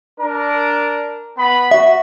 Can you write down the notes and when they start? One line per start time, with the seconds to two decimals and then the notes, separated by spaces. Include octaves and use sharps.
0.20 D4 A#4
1.38 B3 B5
1.71 F#4 E5